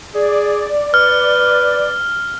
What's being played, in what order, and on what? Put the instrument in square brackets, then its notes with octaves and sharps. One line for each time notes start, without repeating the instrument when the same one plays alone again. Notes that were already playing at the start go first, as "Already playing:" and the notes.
[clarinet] G#4 [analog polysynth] D5
[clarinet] B4 [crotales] F6